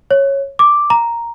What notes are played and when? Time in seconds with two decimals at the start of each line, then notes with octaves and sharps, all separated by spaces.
0.11 C#5
0.59 D6
0.90 A#5